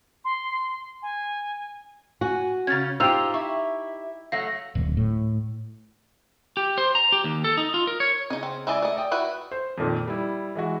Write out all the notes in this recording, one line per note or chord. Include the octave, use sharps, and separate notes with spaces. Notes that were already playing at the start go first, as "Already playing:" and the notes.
C6
G#5
F#4 G#5
C#3 C#4 C#5 G#6 A6
D#4 F4 G4 C5 G5 E6 F6 F7
E4 E5 C#6
F#3 A3 F#4 F5 A#6
D1
A2
G4
C5
A#5
G4
D#2
A4
D#4
F4
A#4
C#5
C#3 D#4 D#5
C4
G#3 E4 D5 D#5 G#5 E6
A3 D#5
D5 G5 D#6
E4 F#4 B4
C5
F2 A#2 D#3
G3 E4
E3 G#3 F#4